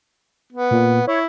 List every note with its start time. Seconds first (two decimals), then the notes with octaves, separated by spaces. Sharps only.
0.52 B3
0.71 A#2
1.07 E4 C#5